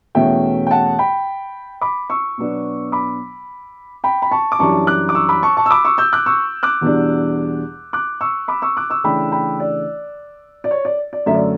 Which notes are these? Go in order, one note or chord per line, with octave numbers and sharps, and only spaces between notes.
E2 B2 A3 C#4 E5 G5
G5
F#5 A5
G5 B5
B5 D6
C#6 E6
B2 F#3 B3 D4
B5 D6
G5 B5
B5
A5 C#6
D6
F#2 E3 G3 D4 A5 C#6
D6 F#6
D6
C#6 E6
B5 D6
A5 C#6
A5 C#6
E6
B5 D6
C#6 E6
E6 G6
D6 F#6
C#6 E6
D6 F#6
E2 B2 G3 D4
D6 F#6
C#6 E6
B5 D6
C#6 E6
D6 F#6
C#6 E6
C#3 E3 A3 D4 G5 B5
G5 B5
D5
D5
C#5
D5
D5
F#2 D3 A3 E5
D5